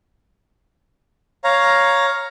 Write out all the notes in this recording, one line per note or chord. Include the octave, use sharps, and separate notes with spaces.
C#5 F5 A#5